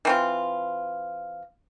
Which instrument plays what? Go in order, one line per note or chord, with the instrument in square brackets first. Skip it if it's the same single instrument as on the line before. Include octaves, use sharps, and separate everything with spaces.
[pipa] E3 C4 F4